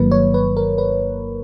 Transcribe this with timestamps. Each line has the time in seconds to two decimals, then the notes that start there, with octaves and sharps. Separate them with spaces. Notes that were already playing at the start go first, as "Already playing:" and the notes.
Already playing: G1 G2 D#3 F#3 A#3 B4
0.11 C#5
0.34 B4
0.56 A#4
0.78 B4